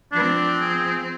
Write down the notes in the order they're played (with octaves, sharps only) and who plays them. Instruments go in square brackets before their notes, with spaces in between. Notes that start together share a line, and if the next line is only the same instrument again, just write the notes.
[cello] F3 C4 [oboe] D4
[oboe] G#4